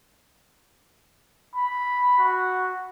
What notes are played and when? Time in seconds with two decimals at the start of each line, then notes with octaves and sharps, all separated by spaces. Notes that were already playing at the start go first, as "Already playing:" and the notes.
1.55 B5
2.19 F#4